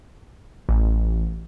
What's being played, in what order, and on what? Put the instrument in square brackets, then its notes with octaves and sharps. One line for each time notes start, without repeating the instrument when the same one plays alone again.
[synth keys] A1